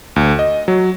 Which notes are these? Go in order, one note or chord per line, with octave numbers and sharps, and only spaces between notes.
D2
D#5
F#3